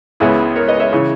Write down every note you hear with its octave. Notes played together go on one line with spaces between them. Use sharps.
C#2 C#3 G#3 B3 E4 G#4
A#4 C#5
B4 D#5
C#5 E5
C#3 E3